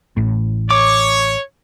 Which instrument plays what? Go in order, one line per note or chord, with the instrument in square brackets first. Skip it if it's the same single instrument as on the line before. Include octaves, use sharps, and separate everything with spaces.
[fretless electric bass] A1 A2
[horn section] C#5 [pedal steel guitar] D6